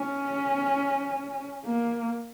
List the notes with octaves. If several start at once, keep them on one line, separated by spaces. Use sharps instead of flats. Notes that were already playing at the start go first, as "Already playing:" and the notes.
Already playing: C#4
A#3